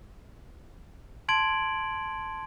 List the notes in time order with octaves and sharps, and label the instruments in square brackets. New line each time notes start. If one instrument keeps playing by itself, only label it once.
[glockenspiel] A5 C6 G#6 D7 F#7